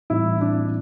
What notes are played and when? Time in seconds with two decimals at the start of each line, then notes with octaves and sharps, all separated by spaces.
0.10 A2 E3 G3 C4 D#4 E4
0.41 D4